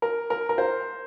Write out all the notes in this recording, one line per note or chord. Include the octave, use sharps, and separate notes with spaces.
A#4
A#4
A#4
C5